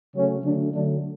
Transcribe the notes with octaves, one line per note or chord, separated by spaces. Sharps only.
C#3 F#3 A3 C#4
D3 F#3 A3 D4
D3 F#3 A3 D4